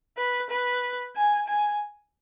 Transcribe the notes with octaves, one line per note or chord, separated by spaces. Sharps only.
B4
B4
G#5
G#5